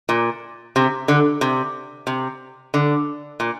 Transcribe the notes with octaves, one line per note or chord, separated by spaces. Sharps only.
A#2
C3
D3
C3
C3
D3
A#2